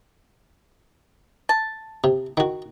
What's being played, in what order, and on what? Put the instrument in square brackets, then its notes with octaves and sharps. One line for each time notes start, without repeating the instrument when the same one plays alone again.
[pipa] A5
[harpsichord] C3
D#3 F#4